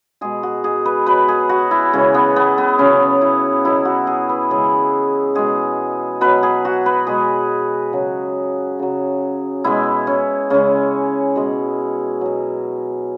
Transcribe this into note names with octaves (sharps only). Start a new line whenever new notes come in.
B2 G#3 G#4
F#4
G#4
B4
B2 F#3 B4
G#4
F#4
E4
C#3 E3 G#3 C#4
B3
B3
B3
C#3 F#3 C#4
E4
B2 F#3 E4
F#4
G#4
B4
C#3 E3 G#3 G#4
B2 G#3 G#4
B2 F#3 B4
G#4
F#4
B4
B2 G#3 G#4
C#3 F#3
C#3 F#3
B2 G#3 E4
C#4
C#3 G#3 C#4
B2 G#3
B2 F#3